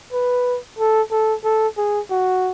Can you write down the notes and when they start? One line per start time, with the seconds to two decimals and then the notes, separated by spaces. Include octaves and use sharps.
0.13 B4
0.79 A4
1.11 A4
1.44 A4
1.77 G#4
2.11 F#4